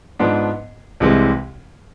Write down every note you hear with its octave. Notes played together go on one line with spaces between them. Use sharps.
G#2 F3 B3 D4
C2 C3 E3 G#3